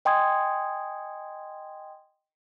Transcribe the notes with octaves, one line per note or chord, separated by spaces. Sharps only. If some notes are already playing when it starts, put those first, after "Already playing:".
D#5 G5 G#5 C6 D#6 G#6